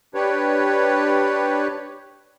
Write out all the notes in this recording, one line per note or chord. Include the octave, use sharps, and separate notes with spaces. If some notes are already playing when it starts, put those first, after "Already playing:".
D4 G4 B4 C#5